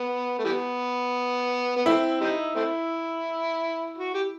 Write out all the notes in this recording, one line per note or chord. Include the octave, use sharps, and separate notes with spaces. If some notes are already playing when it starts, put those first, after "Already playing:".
Already playing: B3
A3
E3 G3 B3
B3
E3 A3 C4 E4
G3 C4 D#4
A3 C4 E4
F#4
G4